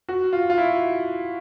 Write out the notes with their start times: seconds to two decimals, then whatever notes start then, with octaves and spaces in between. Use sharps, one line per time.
0.09 F#4
0.33 F4
0.50 F4
0.58 E4